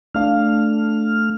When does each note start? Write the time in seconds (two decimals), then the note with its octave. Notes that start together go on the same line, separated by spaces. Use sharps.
0.15 A3 D4 F5 F6